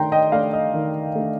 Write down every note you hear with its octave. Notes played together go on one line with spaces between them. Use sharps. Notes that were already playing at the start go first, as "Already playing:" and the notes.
Already playing: D#3 A3 D4 G5 A#5 C6
D#5 G5
A3 D4 D5 F5
D#5
D#3
A3 D4